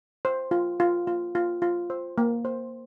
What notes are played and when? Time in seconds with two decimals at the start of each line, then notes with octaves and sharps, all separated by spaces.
0.25 C5
0.51 F4
0.80 F4
1.07 F4
1.35 F4
1.62 F4
1.90 C5
2.18 A#3
2.45 C5